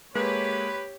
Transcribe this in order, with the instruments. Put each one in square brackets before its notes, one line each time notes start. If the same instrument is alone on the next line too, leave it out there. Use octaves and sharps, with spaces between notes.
[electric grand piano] G#3 A#3 [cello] G4 [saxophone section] B4 [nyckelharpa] C#5